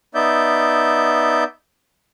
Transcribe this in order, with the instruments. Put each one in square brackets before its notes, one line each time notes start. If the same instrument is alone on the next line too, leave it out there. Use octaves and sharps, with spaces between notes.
[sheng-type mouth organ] B3 D#4 D5 E5 G6